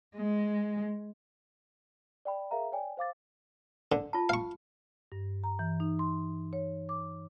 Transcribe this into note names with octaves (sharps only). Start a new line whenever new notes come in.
G#3
D5 G5 B5
G#4 A#4 E5 F5 A#5
C#5 D5 G5 G#5
C5 F5 D6 A6
D3
F4 A5
F5 C#6
G2
A#5
E3
D#4
C6
C#5
D6